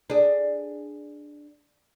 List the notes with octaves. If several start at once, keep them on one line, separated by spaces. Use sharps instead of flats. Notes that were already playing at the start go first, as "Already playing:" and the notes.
D4 G#4